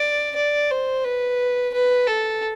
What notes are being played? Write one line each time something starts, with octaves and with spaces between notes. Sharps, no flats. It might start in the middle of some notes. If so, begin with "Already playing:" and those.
Already playing: D5
D5
C5
B4
B4
A4